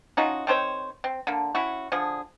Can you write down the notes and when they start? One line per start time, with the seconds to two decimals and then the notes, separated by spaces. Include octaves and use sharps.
0.17 C#4 D#4 F4 F#4
0.47 D#3 C4 C5 C#5
1.04 C4
1.27 D3 A#3
1.55 C#4 E4 F#4
1.92 D3 F3 G#4